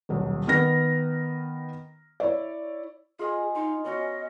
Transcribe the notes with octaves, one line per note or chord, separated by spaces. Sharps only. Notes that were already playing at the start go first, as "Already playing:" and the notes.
D#1 B1
D#3 B3 F6 A#6
E4 C#5 D5
F4 G#4 D#5 G#5
D#4 C6
B3 C#4 F#4 D#5